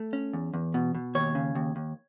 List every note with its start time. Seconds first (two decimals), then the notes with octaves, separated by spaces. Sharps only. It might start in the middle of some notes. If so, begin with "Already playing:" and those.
Already playing: A3
0.13 C#4
0.33 E2
0.54 E2
0.74 B2
0.95 B2
1.15 D#2 C#5
1.35 C#3
1.55 D#2
1.76 D#2